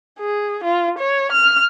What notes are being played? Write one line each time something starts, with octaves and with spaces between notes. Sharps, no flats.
G#4
F4
C#5
F6